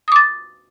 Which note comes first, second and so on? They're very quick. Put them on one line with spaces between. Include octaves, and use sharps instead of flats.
D#6 D6 A6